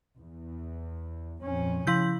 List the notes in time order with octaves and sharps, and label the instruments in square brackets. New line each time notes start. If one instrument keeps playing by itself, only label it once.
[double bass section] E2
A#1 F2 C#4
[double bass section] C#3 [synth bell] F3 E4 G6